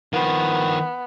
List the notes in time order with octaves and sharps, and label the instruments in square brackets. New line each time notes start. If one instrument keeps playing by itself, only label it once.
[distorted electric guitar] D#3 F3 [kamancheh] B3